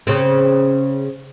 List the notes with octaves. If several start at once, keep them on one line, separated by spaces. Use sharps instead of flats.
C#3 C4